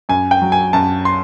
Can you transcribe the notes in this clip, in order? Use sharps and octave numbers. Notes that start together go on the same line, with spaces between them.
F#2 G#5
G5
F#3
G#5
F#2 A5
C6